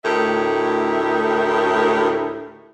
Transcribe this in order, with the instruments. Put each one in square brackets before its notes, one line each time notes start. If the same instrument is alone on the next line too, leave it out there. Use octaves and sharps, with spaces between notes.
[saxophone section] D2 A2 D#4 G4 A#4 E5